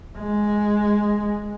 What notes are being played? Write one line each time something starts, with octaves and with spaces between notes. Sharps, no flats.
G#3